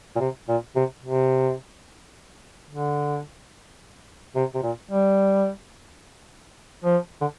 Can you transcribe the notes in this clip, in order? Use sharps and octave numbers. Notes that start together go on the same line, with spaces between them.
A#2
C3
A#2
C3
C3
D3
C3
C3
A#2
G3
F3
D3